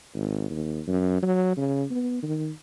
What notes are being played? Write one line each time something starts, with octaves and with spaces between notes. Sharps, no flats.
G#1
D#2
F#2
F#3
C#3
B3
D#3